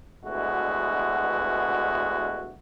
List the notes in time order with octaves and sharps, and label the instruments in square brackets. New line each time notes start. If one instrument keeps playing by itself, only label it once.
[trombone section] D2 G2 B2 G#3 E4 F#4